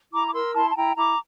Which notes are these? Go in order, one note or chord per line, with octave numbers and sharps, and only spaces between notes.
E4 A#5 D6
D6
A#4 C6 E6
E4 A5 C6
A5
E4 G5 A#5
E4 A#5 D6